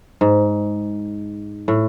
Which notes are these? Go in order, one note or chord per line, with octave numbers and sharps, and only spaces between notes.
G#2
A2